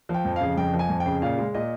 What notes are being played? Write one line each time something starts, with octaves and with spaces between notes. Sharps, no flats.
F3
G5
F2
C#3 F5
F2 G5
F3
G#5
F2
G5
C#3
A#2 F5
G#3
A#2 D#5